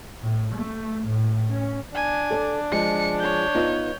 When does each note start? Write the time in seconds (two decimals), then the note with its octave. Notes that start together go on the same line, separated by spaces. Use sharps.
0.23 A2
0.55 A3
1.08 A2
1.50 C#4
1.95 D4 G#5
2.30 A4 D5
2.72 F3 G#3 C#7
3.19 C#5 G6
3.55 B3 D#4 F4